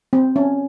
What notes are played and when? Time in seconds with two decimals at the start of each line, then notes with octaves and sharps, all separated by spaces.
0.13 C4
0.36 C#4